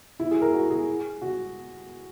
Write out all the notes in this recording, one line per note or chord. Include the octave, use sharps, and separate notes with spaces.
E4
G#4
A#4
F#4
G#4
F#4